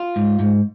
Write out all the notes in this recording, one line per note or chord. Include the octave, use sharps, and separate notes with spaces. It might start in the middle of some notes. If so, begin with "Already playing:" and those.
Already playing: F4
G#2
G#2